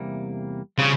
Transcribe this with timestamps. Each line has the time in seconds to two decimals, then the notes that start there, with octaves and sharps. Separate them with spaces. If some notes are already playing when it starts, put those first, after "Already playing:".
Already playing: E2 C3 G3 A#3
0.78 C#3 G3 C4 F4